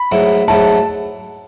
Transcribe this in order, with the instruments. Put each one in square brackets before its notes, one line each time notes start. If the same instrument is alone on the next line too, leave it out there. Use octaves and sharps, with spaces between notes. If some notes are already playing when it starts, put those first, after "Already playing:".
Already playing: [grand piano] B5
[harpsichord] G#2 F#3 A3 E4
[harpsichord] G#2 F#3 A3 E4 [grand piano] A5